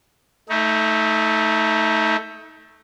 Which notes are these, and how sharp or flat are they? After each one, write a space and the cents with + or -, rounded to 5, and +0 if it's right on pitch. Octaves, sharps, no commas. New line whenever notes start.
A3 +0 D#4 +30